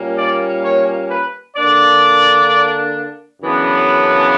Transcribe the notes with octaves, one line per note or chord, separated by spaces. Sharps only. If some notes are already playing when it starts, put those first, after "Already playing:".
Already playing: A#2 G3 A#3 C#4
D5
C#5
B4
D3 A#3 D4 D5
F#2 C#3 E3 B3 D4